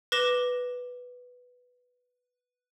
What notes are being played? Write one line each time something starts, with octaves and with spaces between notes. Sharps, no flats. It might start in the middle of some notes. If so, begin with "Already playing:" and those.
B4 D6 A#6 E7 G7